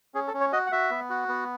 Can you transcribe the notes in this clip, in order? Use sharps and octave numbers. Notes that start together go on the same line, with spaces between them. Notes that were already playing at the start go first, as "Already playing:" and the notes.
C#4 G#4
A4
C#4
C#5
F#4 D#5
F#5
F#4 E5
B3
F#4
B3